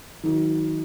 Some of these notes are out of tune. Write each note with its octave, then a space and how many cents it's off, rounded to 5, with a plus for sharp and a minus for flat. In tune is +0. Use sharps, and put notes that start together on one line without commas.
D#3 +35 F#3 +0